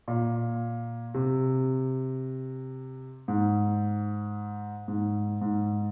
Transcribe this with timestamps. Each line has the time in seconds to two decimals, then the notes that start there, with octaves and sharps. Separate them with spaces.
0.08 A#2
1.14 C3
3.28 G#2
4.88 G#2
5.41 G#2